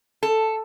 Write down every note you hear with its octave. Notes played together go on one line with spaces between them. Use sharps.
A4